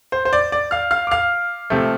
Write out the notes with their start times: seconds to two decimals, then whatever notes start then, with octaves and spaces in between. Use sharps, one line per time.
0.12 C5
0.25 C5
0.33 D5
0.52 D5
0.71 F5 F6
0.91 F5 F6
1.07 D6
1.11 F5 F6
1.70 C3 F3 A3